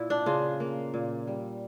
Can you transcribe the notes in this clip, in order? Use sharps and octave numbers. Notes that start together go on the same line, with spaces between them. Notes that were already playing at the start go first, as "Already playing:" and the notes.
Already playing: A#2 E4
D4
C#3 F4
A#3
A#2
G3